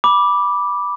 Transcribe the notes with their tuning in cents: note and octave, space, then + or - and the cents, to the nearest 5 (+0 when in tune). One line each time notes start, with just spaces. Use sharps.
B5 -10 D6 +0